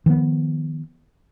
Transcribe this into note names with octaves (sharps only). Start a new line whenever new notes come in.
D#3 F3 A3 B3